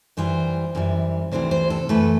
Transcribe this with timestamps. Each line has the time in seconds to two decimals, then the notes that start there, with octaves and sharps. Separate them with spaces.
0.17 F#2 E3 G3 C5
0.75 F#2 E3 G3
1.32 D2 C3 E3 G3 C5
1.51 C5
1.70 A4
1.89 F#2 E3 A3 B4